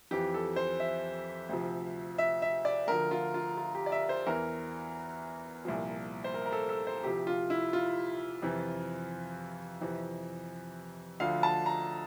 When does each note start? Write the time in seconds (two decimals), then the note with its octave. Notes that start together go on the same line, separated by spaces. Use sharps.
0.11 F2 E3 G4
0.34 A4
0.56 C5
0.80 E5
1.49 D2 C3 F3
2.18 E5
2.42 E5
2.65 D5
2.87 D2 D3 F3 A#4
3.11 F4
3.34 F4
3.57 F4
3.75 G4
3.86 D5
3.92 E5
4.09 C5
4.27 E2 E3 A#4
5.65 C2 A#2 F3
6.24 C5
6.34 A#4
6.46 A#4
6.52 A4
6.69 A4
6.87 C5
7.04 D2 C3 F3 G4
7.27 F4
7.50 E4
7.73 F4
8.42 F2 C3 E3
9.81 F2 C3 E3
11.20 D2 D3 F3 F5
11.43 A5
11.66 A#5